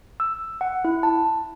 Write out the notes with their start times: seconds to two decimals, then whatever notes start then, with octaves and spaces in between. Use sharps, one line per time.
0.20 E6
0.61 F#5
0.85 E4
1.03 A5